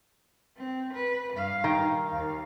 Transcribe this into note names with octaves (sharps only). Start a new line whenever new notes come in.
C4
B4
G2 F5
D#3
D#2 F5